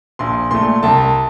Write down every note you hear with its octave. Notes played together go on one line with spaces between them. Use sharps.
A#1 C6
A#2 A3 C6
C2 A5